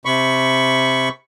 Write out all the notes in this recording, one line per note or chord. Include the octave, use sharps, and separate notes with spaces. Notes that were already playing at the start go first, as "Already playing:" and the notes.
C3 B5 C#6